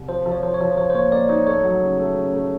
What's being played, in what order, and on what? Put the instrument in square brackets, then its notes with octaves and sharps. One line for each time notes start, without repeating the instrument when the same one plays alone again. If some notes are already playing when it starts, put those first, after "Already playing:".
Already playing: [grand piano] C2
[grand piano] F3 [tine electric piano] C5
[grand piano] F3
[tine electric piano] C#5
[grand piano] F3 [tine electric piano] C5
[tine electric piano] C#5
[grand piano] F3
[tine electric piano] C5
[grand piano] F3 [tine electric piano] C#5
[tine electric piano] C5
[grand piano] A#3 [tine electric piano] C#5
[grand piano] A#3 [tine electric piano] D5
[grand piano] D#4 [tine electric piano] C#5
[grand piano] A3 [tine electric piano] C#5
[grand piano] F#3
C#3
A3
C#3
A3